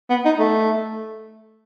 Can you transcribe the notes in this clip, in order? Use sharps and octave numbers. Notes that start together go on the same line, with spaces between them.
B3
D#4
A3